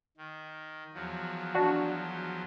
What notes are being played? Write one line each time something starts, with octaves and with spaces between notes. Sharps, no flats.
D#3
E2 F3 F#3
D4 F#4